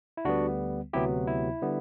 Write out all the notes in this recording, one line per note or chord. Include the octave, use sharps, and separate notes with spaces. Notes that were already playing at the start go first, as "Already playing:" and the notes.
E4
D2 D3 G3 B3 D4 F#4
D2 C3 F#3 B3 E4 G4
E4
D3 G3 B3